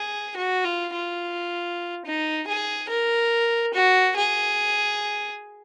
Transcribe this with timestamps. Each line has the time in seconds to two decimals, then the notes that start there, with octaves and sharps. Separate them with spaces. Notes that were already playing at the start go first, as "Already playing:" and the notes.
Already playing: G#4
0.36 F#4
0.65 F4
0.93 F4
2.05 D#4
2.47 G#4
2.89 A#4
3.74 F#4
4.16 G#4